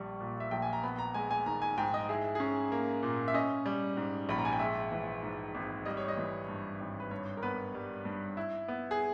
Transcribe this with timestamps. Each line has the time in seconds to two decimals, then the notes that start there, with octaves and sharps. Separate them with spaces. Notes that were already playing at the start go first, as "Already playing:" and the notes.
Already playing: A#1 G3 C#6
0.20 A#2
0.40 E5
0.51 A#1 G5
0.62 G#5
0.73 A#5
0.84 B3 B5
0.99 A#5
1.14 G#3 G#5
1.31 G#5
1.46 D#3 A#5
1.62 G#5
1.78 G#2 G5
1.94 D#5
2.09 E4 G#4
2.35 C#4 G#4
2.72 A#3
3.03 A#2
3.28 E5
3.34 C#4 D#5
3.66 G3
3.97 G#2
4.29 A#1 B5
4.38 A#5
4.45 G#5
4.53 G5
4.60 G#3 E5
4.92 E3
5.23 G#2
5.54 G#1
5.85 G3 D#5
5.97 C#5
6.08 D#5
6.17 E3
6.48 G2
6.80 G#1
7.00 B4
7.11 G2 C#5
7.37 A#4
7.43 B3 B4
7.75 G3
8.05 G2
8.37 E4
8.68 B3
8.91 G#4